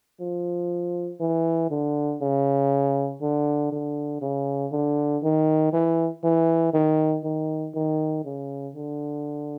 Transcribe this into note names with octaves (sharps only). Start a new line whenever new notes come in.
F3
E3
D3
C#3
D3
D3
C#3
D3
D#3
E3
E3
D#3
D#3
D#3
C#3
D3